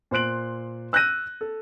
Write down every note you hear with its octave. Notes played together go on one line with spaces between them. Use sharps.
A#2 C5 C6 F#6 D7 F#7
E6 F#6 G6 A#6 D#7
A4